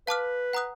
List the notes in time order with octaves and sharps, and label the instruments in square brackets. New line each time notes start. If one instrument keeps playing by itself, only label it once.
[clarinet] B4 [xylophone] F5 A5 D6 F6
[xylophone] F#5 A#5 D#6 F#6